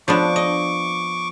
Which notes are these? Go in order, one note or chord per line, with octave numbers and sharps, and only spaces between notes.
F3 B3 D4 C#6 D6
D#5